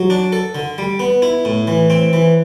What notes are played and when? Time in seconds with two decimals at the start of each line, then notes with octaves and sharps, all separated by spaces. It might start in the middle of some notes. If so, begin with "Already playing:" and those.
Already playing: F#3
0.10 D4
0.32 A4
0.55 D3
0.78 G3
1.00 B3
1.22 E4
1.45 A2
1.67 E3
1.90 C4
2.13 E3